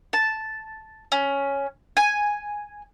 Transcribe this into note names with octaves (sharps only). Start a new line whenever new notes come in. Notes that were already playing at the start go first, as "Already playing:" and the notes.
A5
C#4
G#5